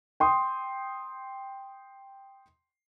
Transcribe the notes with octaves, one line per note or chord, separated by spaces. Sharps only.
G5 C6 D#6